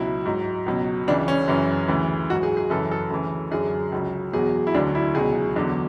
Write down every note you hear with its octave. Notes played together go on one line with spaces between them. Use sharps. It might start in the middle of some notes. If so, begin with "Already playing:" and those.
Already playing: C#2 B2 F#3 E4
G#2 F#3
C#2 B2 F#3
C#2 C#3 E3 D4
C#4
F#2 C#3 E3
D2 C#3 E3
G#2 F#3 F#4
G#4
G#4
F#2 C#3 E3 A4
A4
D2 C#3 E3
F#2 D3 F#3 G#4
C#2 C#3 F#3
E2 B2 F#3 G#4
E4
D2 D3 F#3 D4
E4
C#2 B2 F#3 G#4
E2 D3 F#3